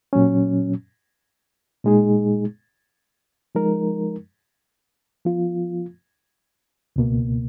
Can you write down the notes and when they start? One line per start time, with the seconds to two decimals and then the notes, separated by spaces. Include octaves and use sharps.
0.13 A#2 F#3 C#4
1.84 A#2 G#3 D#4 G#4
3.55 F3 G#3 D#4 A#4
5.25 F3 B3 F4
6.96 C#2 B2 A#3